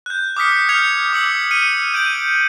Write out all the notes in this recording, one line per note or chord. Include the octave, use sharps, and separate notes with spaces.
F#6 G6
D6 D#6 F6 B6 C#7
F6 G6 G#6 C#7 F7
D6 E6 C#7 F#7
F6 C#7 D#7
G6 D7 D#7 F#7